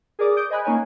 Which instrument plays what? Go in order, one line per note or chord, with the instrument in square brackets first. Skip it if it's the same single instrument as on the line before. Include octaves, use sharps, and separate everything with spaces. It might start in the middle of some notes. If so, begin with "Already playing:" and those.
[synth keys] G#4 A#4 D5 D6 D#6
D#6 G6 D7
C5 D#5 G#5 B5 F#6
A#3 C#4 D#4 A#4 C#5 G#5